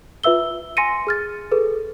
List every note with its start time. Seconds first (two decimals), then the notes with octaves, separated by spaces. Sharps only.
0.24 F4 B4 E5 E6 G7
0.77 G#5 C6 A#6 C#7 D#7
1.07 G#4 F6 A6
1.52 G#4 A4 B4